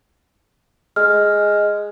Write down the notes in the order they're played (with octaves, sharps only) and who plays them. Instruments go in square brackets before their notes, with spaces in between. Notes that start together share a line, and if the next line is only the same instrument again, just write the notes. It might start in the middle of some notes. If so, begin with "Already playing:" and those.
[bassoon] G#3 [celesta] F6